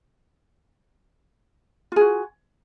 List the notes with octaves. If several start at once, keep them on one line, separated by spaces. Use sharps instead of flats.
F4 F#4 G#4